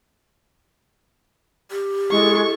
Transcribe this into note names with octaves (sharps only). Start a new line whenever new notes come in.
G4
G#3 E4 A4 C#6